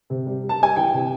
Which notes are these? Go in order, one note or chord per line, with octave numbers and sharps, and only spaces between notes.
C3
G3
G3
A5
G3 G#5
E3 G5
C3